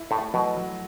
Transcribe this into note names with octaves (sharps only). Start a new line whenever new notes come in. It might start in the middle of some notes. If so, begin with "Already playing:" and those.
Already playing: E4
A2 A3
B2 F#3
F#3